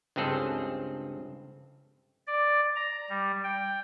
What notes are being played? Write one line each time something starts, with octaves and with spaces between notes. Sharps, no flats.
C#2 G2 C4 G#4 A4
D5
A#5
G3
G5